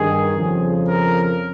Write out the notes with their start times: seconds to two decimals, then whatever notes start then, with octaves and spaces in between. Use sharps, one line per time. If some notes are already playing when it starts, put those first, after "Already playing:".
Already playing: G2 D#3 G#4
0.34 F2 C#3 F3
0.86 A#4